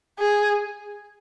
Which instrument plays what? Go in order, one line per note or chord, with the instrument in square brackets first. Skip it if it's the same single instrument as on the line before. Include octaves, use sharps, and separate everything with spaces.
[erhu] G#4